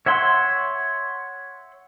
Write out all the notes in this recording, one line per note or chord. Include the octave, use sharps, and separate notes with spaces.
C#5 E5 F#5 C6